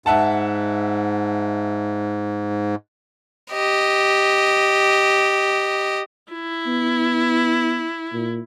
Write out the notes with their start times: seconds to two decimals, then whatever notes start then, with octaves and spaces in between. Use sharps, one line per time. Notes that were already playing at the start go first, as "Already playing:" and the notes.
0.06 G#2 E5 F#5 A5
3.51 G4 D#5
6.32 E4
6.67 B3
8.13 A#2